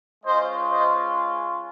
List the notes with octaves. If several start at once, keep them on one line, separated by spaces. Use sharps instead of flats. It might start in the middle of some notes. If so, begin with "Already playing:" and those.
G#3 C#4 F4 C5 D#5
C5 D#5